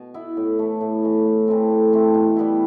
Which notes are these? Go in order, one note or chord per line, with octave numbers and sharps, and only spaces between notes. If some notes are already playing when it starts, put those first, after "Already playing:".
Already playing: B2
B3 E4
A2
E3 A3
A2
E3 A3
A2
E3 A3 C4
A2
E3 A3 C4
B2
G3 B3 E4